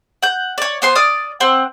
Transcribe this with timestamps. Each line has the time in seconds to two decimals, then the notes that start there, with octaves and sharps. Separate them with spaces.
0.23 F#5 G6
0.58 C#5 D5
0.82 B3 C5 C6
0.95 D5 D6 D#6 F6
1.40 C4 F#5